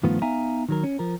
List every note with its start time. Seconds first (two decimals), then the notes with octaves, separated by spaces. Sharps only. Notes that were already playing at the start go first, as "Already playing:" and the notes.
0.03 G2 D#3 F3 A3 B3 F4
0.22 B3 D#4 E5 F5 G#5 A#5
0.69 D#3 F#3 A#4
0.84 C#4
0.99 F3 A#4